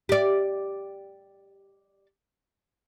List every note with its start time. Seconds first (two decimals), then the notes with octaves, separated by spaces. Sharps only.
0.09 G4 D5